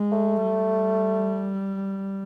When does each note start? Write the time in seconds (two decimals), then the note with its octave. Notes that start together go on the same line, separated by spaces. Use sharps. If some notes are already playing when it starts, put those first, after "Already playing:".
Already playing: G#3
0.12 A3
0.42 G3